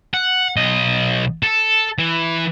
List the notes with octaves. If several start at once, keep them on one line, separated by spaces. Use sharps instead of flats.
F#5
B1 D#5
A4
E3